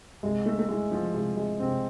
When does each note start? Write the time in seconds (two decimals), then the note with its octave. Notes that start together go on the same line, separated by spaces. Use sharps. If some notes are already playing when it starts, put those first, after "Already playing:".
0.23 C2 G#3
0.46 A3
0.59 A3
0.69 E3 G#3
0.92 F3
1.14 C3 G#3
1.37 G#3
1.59 C3 C4